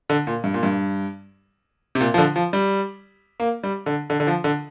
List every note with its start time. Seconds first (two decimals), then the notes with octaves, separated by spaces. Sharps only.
0.09 D3
0.27 A#2
0.44 G2
0.54 A#2
0.63 G2
1.95 C3
2.00 A#2
2.14 F3
2.18 D3
2.36 F3
2.53 G3
3.40 A#3
3.63 G3
3.86 D3
4.10 D3
4.20 D3
4.27 F3
4.44 D3